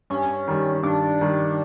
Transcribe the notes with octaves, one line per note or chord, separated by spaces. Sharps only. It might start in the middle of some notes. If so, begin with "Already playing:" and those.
G2 C#4
D#3 G3
G2 D4
D#3 G3